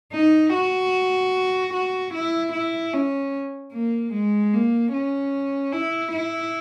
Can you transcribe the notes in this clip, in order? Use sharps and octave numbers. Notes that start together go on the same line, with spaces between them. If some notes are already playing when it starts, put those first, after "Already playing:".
D#4
F#4
F#4
E4
E4
C#4
A#3
G#3
A#3
C#4
E4
E4